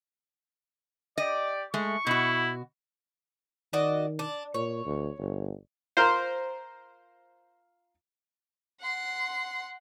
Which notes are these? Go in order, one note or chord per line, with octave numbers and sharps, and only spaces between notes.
G4 D5 D#5
G#3 A3 C#6
B2 E4 F#4
D#3 F#4 D5 D#5
D4
A#2 C#5
D2
G1
F4 A#4 C5
F#5 C6